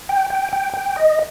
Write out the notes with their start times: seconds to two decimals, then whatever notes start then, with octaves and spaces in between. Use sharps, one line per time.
0.09 G5
0.30 G5
0.53 G5
0.74 G5
0.96 D#5